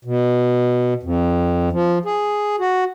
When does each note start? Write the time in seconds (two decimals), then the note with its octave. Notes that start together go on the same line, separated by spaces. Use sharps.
0.05 B2
1.03 F2
1.72 F3
2.05 G#4
2.59 F#4